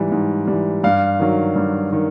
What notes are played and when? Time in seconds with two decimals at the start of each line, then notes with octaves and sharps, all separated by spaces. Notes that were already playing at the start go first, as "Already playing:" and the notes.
Already playing: G#2 E3 G3
0.12 G#2
0.48 E3 G3
0.84 G2 F5
1.20 D#3 F#3
1.56 G2
1.93 D#3